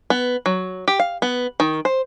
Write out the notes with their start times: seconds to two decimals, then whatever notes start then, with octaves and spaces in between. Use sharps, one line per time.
0.10 B3
0.46 F#3
0.88 G4
0.99 F5
1.22 B3
1.60 D#3
1.85 C5